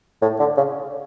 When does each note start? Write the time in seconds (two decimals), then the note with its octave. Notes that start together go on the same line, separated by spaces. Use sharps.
0.22 A2
0.39 D3
0.57 C#3